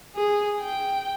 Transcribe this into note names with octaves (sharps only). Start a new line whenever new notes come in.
G#4
G5